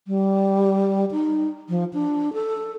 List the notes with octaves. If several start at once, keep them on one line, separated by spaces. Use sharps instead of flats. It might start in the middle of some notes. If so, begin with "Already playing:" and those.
G3
D#4
F3
D4
A4